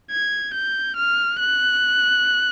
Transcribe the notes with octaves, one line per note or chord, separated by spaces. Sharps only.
G#6
G6
F6
F#6